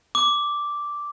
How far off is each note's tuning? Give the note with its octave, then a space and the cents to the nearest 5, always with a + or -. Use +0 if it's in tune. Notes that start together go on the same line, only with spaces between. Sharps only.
D6 -5